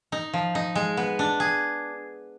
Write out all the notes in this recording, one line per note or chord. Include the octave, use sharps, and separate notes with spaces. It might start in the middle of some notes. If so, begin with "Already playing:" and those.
D#4
F3
D#4
G#3
B3
D4
G#4